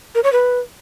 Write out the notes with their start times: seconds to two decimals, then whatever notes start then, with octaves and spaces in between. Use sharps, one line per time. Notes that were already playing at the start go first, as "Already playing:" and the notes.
0.15 A#4
0.24 C#5
0.32 B4